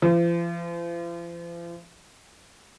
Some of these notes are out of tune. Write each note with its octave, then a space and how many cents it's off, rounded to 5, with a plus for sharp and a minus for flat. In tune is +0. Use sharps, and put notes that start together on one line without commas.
F3 -40